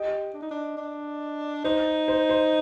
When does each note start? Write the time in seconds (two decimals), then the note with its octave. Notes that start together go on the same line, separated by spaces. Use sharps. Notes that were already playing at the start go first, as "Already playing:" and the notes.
Already playing: G4 D#5
0.34 D4
0.42 D#4
0.51 D4
0.77 D4
1.64 D#4 C5
2.08 C5
2.29 C5